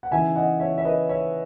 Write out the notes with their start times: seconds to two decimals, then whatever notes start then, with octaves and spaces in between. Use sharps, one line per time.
0.03 F#5
0.11 C#3 E3 B3 D#4 E5 G#5
0.35 D#5 F#5
0.60 C#5 E5
0.78 E5
0.85 B4 D#5
1.09 C#5 E5